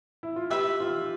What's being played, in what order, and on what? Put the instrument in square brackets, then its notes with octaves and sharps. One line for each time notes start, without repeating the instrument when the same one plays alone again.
[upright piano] E4
F4
[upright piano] G4 [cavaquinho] B4 E5 B5
[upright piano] F4